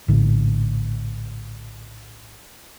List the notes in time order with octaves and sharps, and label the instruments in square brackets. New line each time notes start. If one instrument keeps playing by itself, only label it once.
[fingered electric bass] A#1 A2 D3